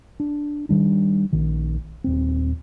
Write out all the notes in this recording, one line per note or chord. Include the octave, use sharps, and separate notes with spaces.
D4
D#3 G3 D4
A#1 D#3
D#1 C4